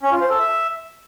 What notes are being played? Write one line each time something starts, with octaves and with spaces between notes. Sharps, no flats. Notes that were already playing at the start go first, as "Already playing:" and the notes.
C#4
F4
C5
A4
E5